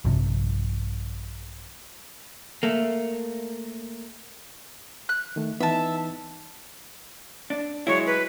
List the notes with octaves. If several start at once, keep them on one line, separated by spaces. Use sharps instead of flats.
A#1 G2 C3 F3
A3 A#3
F#6
D#3 A3
E3 B3 D#4 E5 A5
D4
F#3 G#3 E4 C#5
B4